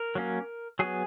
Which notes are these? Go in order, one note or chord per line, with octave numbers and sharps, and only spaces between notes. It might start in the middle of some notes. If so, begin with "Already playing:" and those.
Already playing: A#4
F#3 A#3 C#4
F#3 B3 G#4